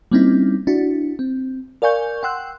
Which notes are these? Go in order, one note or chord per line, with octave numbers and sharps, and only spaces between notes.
G3 A#3 C4 C#4 D#4 E4
D4 E4 F#4
C4
A#4 D5 F5 G#5 C#6 G6
F#5 G5 C6 E6 F#6